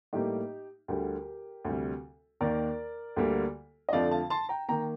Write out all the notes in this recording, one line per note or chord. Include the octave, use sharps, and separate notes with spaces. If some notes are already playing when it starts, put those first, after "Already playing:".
A2 G3 A#3 D#4 G4
D2 D3 G3 G4 A#4
D2 C3 G3
D#2 D#3 A#3 A#4 D5
D2 D3 G3 A#3
D#5
F2 D3 F3 A3 D5 F5
F5 A5
A5 C6
G5 A#5
D#3 A#3 G5 A#5